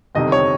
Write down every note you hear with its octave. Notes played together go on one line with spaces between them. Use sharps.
G1 F2 C3 D#3 G3 D#5
C#5